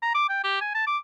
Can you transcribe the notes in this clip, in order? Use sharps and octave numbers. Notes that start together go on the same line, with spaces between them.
A#5
D6
G5
G4
G#5
A5
D6